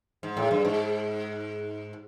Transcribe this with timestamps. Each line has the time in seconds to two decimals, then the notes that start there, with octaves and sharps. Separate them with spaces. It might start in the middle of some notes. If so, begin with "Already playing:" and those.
0.23 G#2
0.37 A2
0.51 G2
0.65 G#2